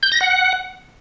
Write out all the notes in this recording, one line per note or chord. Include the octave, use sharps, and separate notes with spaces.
G6
A#6
F#5